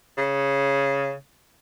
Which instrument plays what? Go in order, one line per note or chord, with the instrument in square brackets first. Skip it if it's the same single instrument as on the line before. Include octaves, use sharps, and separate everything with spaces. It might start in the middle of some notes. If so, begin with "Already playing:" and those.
[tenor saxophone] C#3